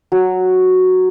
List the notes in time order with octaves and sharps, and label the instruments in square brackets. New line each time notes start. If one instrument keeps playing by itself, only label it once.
[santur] F#3